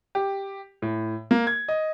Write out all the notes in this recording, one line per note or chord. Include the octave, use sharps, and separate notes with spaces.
G4
A2
A#3
G#6
D#5